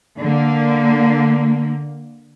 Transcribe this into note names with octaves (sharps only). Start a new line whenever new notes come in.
D3 A#3